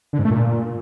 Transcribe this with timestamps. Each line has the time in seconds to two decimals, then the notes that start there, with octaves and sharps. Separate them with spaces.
0.13 D3
0.19 G#2
0.25 A3
0.31 A#2